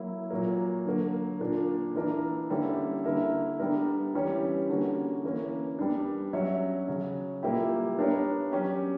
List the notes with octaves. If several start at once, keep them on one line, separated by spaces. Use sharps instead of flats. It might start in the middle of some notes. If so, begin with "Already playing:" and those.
Already playing: F#3 A#3 E4
A#2 F#3 A#3
D3 F#3 A#3
A#2 A#3 D4
E3 A#3 D4 A#4
D3 G3 A#3 C#4 E4
D3 A#3 E4 A#4 E5
D3 G3 B3 D4 A#4
E3 G3 C#4 G4 C#5
D3 A#3 C#4 F#4
E3 A#3 C#4
G3 B3 D4
F#3 C#4 F#4 C#5 E5
C#3 F#3 C#4
A#2 G3 A#3 E4 G4
B3 D4 G4 A#4 C#5
F#3 C#4 G4